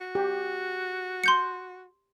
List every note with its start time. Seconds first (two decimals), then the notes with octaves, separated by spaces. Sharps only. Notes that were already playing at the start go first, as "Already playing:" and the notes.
0.01 F#4
0.15 G4
1.24 C6 G6 C#7